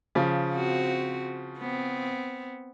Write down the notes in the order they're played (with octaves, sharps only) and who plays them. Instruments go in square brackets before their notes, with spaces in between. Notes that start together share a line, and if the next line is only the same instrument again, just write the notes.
[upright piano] C#3 F3
[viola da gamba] C4 F#4
B3 C4